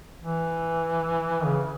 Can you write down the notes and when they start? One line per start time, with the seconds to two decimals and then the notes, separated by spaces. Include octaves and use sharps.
0.21 E3
1.45 C#3